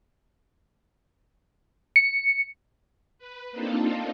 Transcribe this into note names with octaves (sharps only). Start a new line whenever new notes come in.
C#7
B4
A#3 C4 D4 D#4 F4 A4